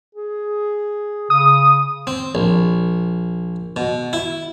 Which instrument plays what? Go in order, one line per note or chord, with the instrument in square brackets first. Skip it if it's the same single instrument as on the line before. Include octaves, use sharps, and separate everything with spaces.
[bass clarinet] G#4
[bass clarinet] C#3 [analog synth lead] D#6
[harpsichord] C4
A#1
B2
E4